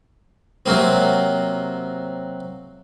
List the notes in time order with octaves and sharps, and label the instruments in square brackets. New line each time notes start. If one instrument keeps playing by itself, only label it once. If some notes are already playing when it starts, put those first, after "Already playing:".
[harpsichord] C3 F#3 A#3 C4